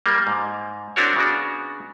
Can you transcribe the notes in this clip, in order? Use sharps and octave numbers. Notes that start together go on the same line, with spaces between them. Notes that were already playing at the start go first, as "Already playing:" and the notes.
G3 A#3
G#2
C4 D4 E4 F#4 A#4 C#5
C#3 B3 D4 F#4